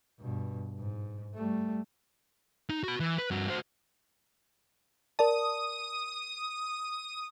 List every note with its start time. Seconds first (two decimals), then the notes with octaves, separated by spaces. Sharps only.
0.20 G2 B2
0.79 G#2
1.35 G3 A3
2.69 D#4
2.84 F#4 B5
3.00 E3
3.18 B4
3.31 G2 F#4
3.48 F#4 C5
5.19 A#4 D5 A5 D#6